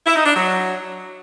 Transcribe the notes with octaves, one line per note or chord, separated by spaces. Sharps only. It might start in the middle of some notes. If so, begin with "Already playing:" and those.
E4
D#4
D4
F#3